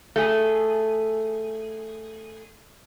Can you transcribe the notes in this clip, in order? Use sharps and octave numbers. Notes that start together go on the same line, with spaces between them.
A3 G#4